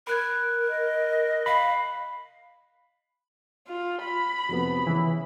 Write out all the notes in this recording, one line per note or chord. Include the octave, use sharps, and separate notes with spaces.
A#4 B5 F#6 G#6
D#5
F5 B5
F4
B5
F2 C3 B3
C#3 E3